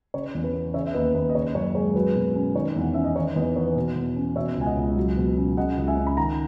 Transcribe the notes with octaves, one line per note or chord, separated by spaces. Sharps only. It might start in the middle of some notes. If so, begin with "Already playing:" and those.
C#3 C#5
E2
B4
B3
C#3 C#5 E5
E5
D#2 B4 D#5
D#2 B4
D#5
C#3 C#5
F#2 C#5
G#3 C#5
F#3 B4
B2
C#4
D#3 C#5
E2
F#5
C#4 E5
D#5
D#3 C#5
E2 B4 D#5
B3 C#5
B2
E2
C#4
B2 C#5 E5
C#2 G#5
D#5 F#5
C#2
F#3
B2
C#4
C#3 D#5 F#5
C#2
E5 G#5
C#4
B5
D#3 F#5 A#5